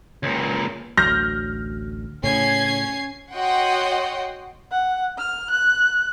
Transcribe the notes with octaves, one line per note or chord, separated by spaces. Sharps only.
C#2 A#2
A1 D2 F#3 F6 G6 A#6
A2 C#3 C#4 G#6 C7
F#4 C#5 D#5 F#5 G5 C6
F#5
F6
F#6